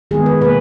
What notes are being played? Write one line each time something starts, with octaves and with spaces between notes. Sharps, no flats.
D#3 G#3 B3 G#4
B4
B2 A#3 B4